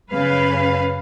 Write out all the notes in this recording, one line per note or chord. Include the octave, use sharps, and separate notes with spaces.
F#2 C#3 B4 F5